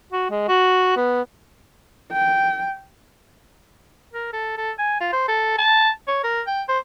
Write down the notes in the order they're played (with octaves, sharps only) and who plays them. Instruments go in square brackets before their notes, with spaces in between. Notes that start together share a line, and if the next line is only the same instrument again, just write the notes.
[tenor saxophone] F#4
G#3
F#4
B3
[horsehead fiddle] G5
[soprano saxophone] A#4
A4
A4
G#5
F4
C5
A4
A5
C#5
A#4
G5
C5